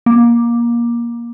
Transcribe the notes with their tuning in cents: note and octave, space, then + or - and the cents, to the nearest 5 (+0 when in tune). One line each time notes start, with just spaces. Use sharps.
A#3 +20